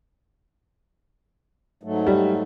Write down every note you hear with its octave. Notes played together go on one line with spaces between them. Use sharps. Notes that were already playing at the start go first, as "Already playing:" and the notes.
G#2 F#3 A3
G3